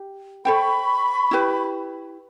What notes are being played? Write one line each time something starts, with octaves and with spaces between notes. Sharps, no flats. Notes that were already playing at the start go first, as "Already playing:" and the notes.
Already playing: G4
A4 C5 E5 G5 B5 C#6
E4 G4 B4